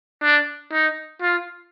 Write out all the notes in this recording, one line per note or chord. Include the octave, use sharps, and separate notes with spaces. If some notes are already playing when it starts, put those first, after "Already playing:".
D4
D#4
F4